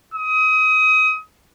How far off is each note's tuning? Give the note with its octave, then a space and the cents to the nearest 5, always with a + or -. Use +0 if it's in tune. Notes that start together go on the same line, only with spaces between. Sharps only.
D#6 +25